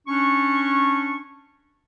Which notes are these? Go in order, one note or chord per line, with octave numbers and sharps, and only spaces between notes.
C#4 D4 C#6